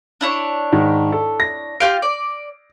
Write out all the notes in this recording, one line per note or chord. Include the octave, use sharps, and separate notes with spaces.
D4 E4 C#5
G#2 D#3
A4
A#6
F4 G4 F5 D7
D5